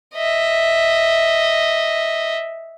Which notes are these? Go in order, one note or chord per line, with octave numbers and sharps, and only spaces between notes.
D#5 E5